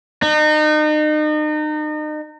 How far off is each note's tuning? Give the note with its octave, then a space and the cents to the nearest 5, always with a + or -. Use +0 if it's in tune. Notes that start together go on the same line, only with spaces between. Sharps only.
D#4 -35